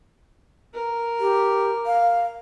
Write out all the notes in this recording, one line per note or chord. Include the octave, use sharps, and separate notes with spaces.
A#4
G4
F5